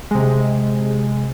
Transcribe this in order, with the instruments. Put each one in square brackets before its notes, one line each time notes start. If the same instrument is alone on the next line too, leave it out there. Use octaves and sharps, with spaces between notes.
[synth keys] C3 G#3